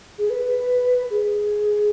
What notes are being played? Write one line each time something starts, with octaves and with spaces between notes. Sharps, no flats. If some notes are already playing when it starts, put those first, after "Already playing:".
G#4
B4
G#4